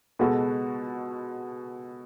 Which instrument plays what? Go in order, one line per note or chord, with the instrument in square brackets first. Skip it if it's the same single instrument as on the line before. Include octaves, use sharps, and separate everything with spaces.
[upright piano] B2 G#3 B3 F#4 A4